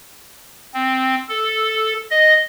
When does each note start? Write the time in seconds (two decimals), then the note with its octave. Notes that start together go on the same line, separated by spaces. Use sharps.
0.74 C4
1.29 A4
2.11 D#5